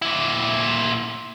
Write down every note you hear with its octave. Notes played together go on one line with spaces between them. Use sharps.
A#2 E4